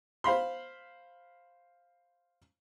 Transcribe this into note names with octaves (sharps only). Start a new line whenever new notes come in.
C5 F5 B5 C6